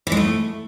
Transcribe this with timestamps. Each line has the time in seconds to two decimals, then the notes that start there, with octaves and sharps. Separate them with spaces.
0.07 E3
0.12 G#3
0.17 A3